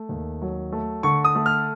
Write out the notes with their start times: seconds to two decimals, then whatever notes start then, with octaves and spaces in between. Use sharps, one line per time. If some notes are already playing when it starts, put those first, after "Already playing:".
Already playing: A3
0.09 D#2
0.42 F#3
0.72 A3
1.03 D3 C#6
1.25 D#6
1.35 A3
1.46 F6